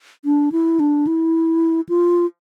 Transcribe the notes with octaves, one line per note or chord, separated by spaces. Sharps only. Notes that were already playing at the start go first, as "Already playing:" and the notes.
D4
E4
D4
E4
F4